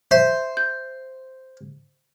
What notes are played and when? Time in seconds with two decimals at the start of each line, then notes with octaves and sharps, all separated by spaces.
0.11 C5 E5
0.57 G6